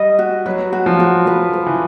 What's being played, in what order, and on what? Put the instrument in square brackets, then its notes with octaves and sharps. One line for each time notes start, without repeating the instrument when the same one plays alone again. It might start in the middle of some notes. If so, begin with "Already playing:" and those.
Already playing: [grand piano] G3 [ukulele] D#5
[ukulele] F#4
[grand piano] F#3 [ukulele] B4
[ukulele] F#4
[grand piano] F3
[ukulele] F#4
[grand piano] F3 [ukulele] B4
[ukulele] B4
[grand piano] E3